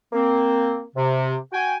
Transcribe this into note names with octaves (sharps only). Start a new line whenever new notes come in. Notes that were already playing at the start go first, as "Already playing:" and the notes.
A#3 C4
C3
F#4 G5 G#5